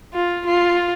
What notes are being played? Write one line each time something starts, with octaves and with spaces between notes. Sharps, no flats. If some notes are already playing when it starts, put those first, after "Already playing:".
F4
F4